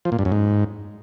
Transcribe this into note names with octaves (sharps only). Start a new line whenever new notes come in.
F3
A#2
G2
F#2
G#2